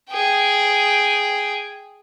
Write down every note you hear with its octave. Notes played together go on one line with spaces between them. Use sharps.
G#4 G5